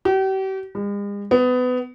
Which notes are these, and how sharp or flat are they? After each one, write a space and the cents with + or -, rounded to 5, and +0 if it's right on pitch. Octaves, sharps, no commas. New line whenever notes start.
G4 -40
G#3 -45
B3 +25